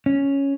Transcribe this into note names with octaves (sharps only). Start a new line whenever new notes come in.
C#4